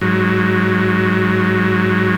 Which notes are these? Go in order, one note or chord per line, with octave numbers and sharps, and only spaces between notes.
G#2 F#3